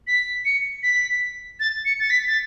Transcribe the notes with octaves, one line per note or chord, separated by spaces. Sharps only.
B6
C#7
B6
A6
C#7
A6
B6
A6